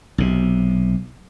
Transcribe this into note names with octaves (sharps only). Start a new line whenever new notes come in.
B1 C3